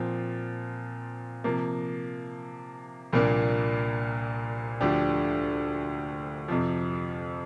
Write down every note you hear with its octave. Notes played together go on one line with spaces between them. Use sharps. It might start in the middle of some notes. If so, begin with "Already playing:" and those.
Already playing: A#2 F3 C4
C3 F3 A#3
C2 A#2 F3 A#3 D4
D2 D3 F3 D4 G4
F2 C3 F3